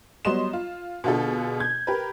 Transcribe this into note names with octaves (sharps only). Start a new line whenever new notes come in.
F#3 G3 B3 D#5 C6 E7
F4
B2 D3 F4 F#4 G#4 A4
G6 G#6
G4 A#4 B4